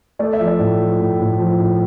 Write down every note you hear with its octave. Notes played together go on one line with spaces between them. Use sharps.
A3 D5
E5
F3
D5
A2
F3
A2
A2
F3
A2